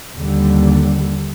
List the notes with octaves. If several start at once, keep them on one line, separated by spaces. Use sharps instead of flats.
D#2 D3 G3